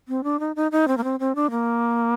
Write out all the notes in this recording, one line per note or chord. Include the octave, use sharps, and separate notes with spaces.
C4
D4
D#4
D#4
D#4
C4
A#3
C4
C4
D4
A#3